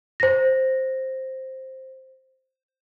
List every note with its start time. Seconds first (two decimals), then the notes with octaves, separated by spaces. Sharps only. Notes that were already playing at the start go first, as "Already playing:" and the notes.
0.20 C5 A#6